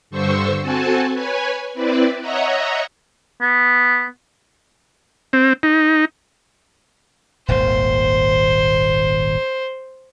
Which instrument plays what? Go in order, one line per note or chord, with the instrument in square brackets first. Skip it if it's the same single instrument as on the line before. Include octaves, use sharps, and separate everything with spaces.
[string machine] G2 D3 C5 C#6 E6
C4 F#4 A4 G#5 A5
B4 C#5 G#5
C4 E4 B4 D5
C#5 D#5 E5 F#5 A#5
[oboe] B3
[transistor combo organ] C4
D#4
[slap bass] D#1 G#1 D#2 [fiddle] C5